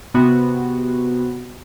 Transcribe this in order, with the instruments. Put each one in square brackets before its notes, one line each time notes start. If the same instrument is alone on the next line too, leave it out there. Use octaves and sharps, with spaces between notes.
[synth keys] C3 B3 F#4